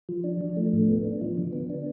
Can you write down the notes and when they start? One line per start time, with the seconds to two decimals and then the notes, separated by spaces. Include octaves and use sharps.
0.09 F3
0.24 D4
0.41 F3
0.57 A3
0.73 A2
0.88 B3
1.04 D4
1.21 F3
1.37 D3
1.53 B3
1.70 D4